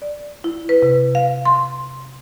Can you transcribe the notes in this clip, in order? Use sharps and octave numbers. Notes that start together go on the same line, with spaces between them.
D5
E4
B4
C3
F5
C6